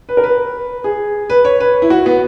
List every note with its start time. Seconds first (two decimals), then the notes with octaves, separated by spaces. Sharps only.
0.09 B4
0.17 A#4
0.24 B4
0.84 G#4
1.30 B4
1.45 C#5
1.60 B4
1.82 E4
1.90 F#4
2.06 B3